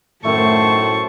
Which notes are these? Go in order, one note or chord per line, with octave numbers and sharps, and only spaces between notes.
F#2 A2 D#3 A3 C5 A5 C#6